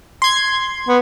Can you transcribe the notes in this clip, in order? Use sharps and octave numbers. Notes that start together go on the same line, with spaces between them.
C6 G#6
B3